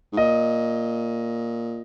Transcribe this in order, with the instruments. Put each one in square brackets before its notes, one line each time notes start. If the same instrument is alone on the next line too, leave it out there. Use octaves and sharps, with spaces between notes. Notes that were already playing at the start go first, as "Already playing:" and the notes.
[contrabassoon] G#2
[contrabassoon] A#2 [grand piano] D#5